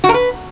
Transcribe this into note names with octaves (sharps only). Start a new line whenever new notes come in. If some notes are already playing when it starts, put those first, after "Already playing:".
F#4
A#4
B4